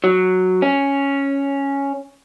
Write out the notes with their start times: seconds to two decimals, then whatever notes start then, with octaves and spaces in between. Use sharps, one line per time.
0.04 F#3
0.62 C#4